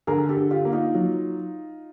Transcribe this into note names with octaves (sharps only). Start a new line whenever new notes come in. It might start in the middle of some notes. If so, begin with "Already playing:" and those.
D3 G#4 A#4
G4 A4
D3
F4 G4
A#3
D#4 F4
F#3